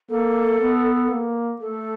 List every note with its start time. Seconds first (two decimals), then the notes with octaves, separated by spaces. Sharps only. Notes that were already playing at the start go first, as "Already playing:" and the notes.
0.10 A#3 A4
0.60 B3
1.10 A#3
1.61 A3 A4